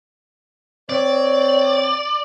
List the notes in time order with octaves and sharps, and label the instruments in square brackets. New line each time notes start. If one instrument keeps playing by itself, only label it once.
[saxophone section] C4 C#5 [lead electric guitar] D5